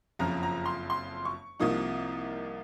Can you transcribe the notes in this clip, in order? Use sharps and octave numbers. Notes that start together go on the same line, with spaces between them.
F#1 F2 C#3 F3 A#5
A#5
C6
C6
C#6
C2 C3 F3 A#3 D#4 D#6